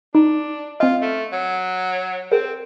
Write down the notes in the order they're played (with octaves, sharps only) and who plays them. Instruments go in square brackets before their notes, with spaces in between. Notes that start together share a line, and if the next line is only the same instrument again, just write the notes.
[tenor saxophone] D4 [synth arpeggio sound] D#4
[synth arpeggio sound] C4 D#5 [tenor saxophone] F4
[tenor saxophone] A3
F#3
[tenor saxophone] C4 [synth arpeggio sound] G#4 A#4